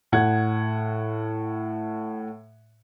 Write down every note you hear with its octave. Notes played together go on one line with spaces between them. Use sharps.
A2 F#5 G#6